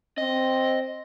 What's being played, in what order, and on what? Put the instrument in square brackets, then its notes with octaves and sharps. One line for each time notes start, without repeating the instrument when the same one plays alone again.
[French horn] C4 [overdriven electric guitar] D#5